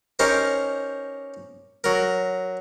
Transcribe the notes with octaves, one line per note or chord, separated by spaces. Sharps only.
C#4 D#4 G4 A#4 C5
F#3 A#4